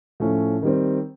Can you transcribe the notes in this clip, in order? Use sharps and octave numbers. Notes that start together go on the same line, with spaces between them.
A2 F3 A3 C#4
D#3 G3 C4